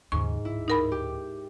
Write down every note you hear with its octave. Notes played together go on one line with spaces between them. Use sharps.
D#2 G#2 C#3 C#6
D1 E4
D#4 A#4 B5
G4